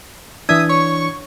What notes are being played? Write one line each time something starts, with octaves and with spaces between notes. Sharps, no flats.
E3 D4 E5 D#6 G#6
C#5 C#6